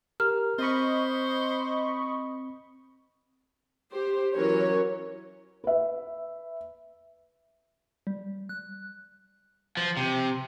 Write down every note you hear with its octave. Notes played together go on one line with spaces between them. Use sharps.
G4 A#4 A#5 F6
C4 C5 D#5 B5 C#6
G4 C5
E3 F#3 C#4 A#4 C#5
B4 E5
G3
F#6
F3
C3